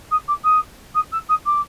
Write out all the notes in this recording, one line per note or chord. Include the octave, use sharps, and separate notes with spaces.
D#6
D6
D#6
D#6
E6
D#6
D6